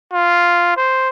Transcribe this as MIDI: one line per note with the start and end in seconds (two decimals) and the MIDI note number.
0.13 0.73 65
0.77 1.09 72